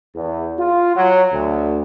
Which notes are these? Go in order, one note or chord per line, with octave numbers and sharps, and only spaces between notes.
E2
F4
F#3
D2